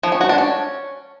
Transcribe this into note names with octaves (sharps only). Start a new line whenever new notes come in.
F3
C#4
F#4
D4
C#4